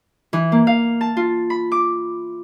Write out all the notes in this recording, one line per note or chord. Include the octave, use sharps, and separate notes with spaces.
E3
A#3
F5
A5
F4
B5
D6